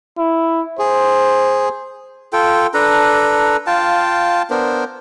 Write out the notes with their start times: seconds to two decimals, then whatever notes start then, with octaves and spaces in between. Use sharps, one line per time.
0.18 E4
0.79 G#4 C5
2.33 F4 A4 G5
2.74 D4 A4 B4 A#5
3.67 F4 F5 G5 A5
4.50 B3 D4 A#4 C5